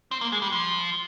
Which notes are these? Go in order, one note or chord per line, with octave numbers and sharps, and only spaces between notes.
C4
A#3
G#3
G3
F3